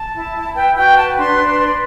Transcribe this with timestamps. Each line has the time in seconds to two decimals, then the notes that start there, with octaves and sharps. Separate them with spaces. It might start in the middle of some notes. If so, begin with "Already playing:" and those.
Already playing: A5
0.14 E4
0.35 E4
0.55 B4 G5
0.75 F#4 G5
0.96 B4 A5
1.17 D4 C6
1.38 D4
1.59 B4